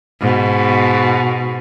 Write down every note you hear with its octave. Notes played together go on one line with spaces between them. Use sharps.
G#2 B2